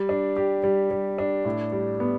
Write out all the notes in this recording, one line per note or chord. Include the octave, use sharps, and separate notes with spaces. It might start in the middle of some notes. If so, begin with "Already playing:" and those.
Already playing: G3
D4
G4
G3
G3
D4
A2
G3
B3